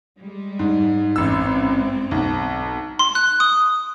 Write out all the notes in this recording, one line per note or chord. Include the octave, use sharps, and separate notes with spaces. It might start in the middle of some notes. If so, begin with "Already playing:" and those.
G3 G#3
G#2
A1 G#2 C4 E6
B1
C6
F#6
D#6